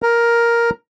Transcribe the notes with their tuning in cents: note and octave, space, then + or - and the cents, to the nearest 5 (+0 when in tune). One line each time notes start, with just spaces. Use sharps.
A#4 +5